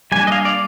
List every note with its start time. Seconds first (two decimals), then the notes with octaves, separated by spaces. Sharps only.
0.12 G3 A#3 D4 G#5
0.27 D#5
0.32 F5
0.45 D5